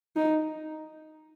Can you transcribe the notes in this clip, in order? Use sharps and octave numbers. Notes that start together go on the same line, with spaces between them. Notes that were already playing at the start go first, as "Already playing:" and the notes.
D#4